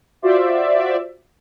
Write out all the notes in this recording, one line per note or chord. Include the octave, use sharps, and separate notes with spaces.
F4 F#4 C5 D5 E5